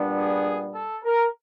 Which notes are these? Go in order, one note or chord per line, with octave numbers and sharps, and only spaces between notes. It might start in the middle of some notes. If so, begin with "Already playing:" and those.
Already playing: A#2 G3 B3 D4
G#4
A4
A#4